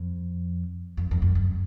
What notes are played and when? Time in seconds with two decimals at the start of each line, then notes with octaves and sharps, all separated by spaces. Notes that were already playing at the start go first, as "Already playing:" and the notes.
Already playing: F2
0.97 F2
1.11 F2
1.22 F#2
1.35 F#2